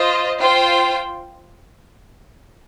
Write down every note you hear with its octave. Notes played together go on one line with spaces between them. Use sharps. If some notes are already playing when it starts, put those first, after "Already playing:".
Already playing: F4 C5 D#5
F4 C5 G5